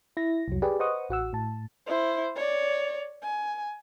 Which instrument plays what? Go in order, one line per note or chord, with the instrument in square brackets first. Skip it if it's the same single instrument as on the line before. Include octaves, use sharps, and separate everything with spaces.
[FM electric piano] E4 A#6
C2 F2 F#3
G4 G#4 B4 D5
B4 C5 D#5 F#5 C#6 D#6
A1 F#4 F#5 E6
A2 A5
[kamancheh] E4 C5
C#5 D5
G#5